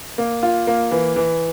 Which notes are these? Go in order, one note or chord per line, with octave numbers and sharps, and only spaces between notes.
A#3
F4
A#3
E3
E3